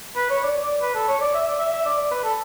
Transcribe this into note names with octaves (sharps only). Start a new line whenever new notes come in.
B4
C#5
D5
D5
B4
A4
C#5
D5
E5
D5
E5
E5
D5
D5
B4
A4